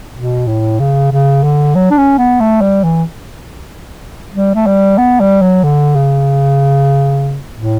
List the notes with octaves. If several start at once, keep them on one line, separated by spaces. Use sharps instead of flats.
B2
A2
C#3
C#3
D3
F#3
D4
C#4
B3
A3
G3
E3
G3
A3
G3
B3
G3
F#3
D3
C#3
A2